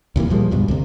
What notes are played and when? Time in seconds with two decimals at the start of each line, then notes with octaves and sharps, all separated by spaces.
0.16 D#2 C3 E3 A#3
0.30 A#2 F3 G3 G#3
0.51 C#2 G2 B2
0.68 D2 C3